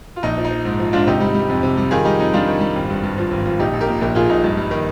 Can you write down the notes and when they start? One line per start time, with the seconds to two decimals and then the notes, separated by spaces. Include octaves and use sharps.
0.16 F4
0.23 A#1 D#4
0.37 F3
0.45 D#4
0.50 F3
0.65 G#2
0.79 F3
0.93 G#2 D4 F4
1.06 C3 D#4 G4
1.20 G3
1.34 G3
1.49 F2
1.63 C3
1.77 G3
1.91 D#3 F4 G#4
2.05 G3 D#4 G4
2.19 F2 D#4
2.33 G3 D4 F4
2.47 D#3
2.61 G3
2.76 G#1
2.90 G2
3.04 G2
3.18 F3
3.31 G#1
3.45 F3
3.59 A#1 D#4 G4
3.73 A#1
3.80 G4 A#4
3.87 A#2
4.01 A#1 G4 A#4
4.15 A#2 F4 G#4
4.29 A#1 D#4
4.44 G2
4.57 G3
4.71 D#3